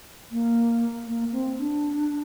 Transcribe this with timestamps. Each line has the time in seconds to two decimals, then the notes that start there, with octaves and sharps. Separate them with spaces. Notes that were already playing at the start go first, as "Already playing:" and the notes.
0.31 A#3
1.07 A#3
1.32 C4
1.58 D4